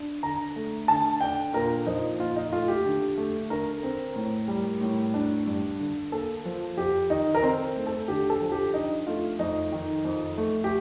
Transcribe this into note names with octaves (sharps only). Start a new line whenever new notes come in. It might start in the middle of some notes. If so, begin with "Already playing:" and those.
Already playing: D4
D3 A#5
A3
D3 A5
D4 G5
A#2 A#4
F3 D#4
A#2 F4
D#4
A3 F4
G4
D3
A3
D3 A#4
C4
A2
G3
A2
D4
G2
D3
A#3 A4
F3
F2 G4
D#3 D#4
A#4
C4 C5
A3
A4
D3 G4
A4
F3
G4
D4 D#4
A3 F4
F2 D#4
D#3
F2
A3
G4